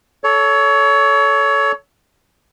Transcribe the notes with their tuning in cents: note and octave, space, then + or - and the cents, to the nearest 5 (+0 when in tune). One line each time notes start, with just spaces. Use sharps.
A4 -10 C#5 +25